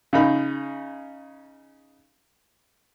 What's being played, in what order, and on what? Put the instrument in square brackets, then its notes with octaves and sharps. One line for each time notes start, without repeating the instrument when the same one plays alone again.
[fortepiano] C#3 D#4 B5